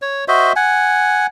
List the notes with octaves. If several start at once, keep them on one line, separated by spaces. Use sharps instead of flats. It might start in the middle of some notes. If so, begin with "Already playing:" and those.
C#5
F#4 C5 D#5 E5
F#5 G#5